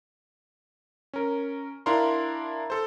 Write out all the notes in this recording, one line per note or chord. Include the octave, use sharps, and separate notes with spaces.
C#4 A#4
D4 E4 A#4 F5 A#5 C6
A4 C5